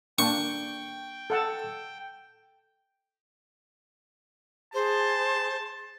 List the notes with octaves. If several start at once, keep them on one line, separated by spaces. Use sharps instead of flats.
A#3 D4 G5 C#6
A4 F#5 A5
G#4 C5 A5